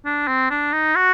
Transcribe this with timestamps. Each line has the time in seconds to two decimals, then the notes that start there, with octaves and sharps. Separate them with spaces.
0.05 D4
0.27 C4
0.50 D4
0.72 D#4
0.95 F#4